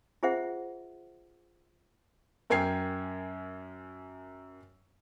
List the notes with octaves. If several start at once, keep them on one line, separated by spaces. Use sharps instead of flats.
F4 G#4 C5 E5 F#5
F#2 A#4 G5 G#5 G#6 C7